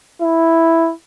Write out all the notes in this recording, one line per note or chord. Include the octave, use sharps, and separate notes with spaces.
E4